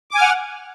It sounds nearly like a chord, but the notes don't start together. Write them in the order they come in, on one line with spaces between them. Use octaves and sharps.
D6 G#5 F6 F#5